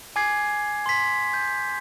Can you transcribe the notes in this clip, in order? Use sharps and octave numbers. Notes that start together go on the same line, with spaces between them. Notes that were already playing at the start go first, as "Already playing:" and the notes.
G#5 D6 G#6 C7
C6 B6
G6